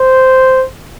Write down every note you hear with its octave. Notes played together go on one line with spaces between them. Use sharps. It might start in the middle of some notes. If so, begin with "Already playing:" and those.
Already playing: C5